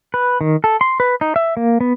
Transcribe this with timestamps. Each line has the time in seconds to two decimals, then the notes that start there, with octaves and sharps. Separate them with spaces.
0.14 B4
0.41 D#3
0.64 A4
0.81 C6
1.00 B4
1.21 D#4
1.36 E5
1.57 A#3
1.81 B3